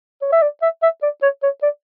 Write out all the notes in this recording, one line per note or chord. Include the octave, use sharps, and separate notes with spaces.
C#5
E5
D5
E5
E5
D5
C#5
C#5
D5